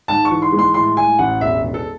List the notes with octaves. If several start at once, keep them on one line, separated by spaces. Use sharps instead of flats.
G#2 A5
C#6
E3
C6
G#3
C6
A2 C6
A2 G#5
A1 F#5
E1 E5
E1
A4